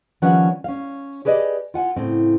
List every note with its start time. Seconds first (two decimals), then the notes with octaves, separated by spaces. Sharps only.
0.22 D#3 F3 G3 C#4 B4 F#5
0.64 C#4 F5
1.25 G4 G#4 B4 D5 D#5
1.74 F4 F#5 G#5
1.97 A2 C#3 C4